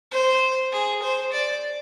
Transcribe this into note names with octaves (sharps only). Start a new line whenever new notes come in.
C5
G#4
C5
D5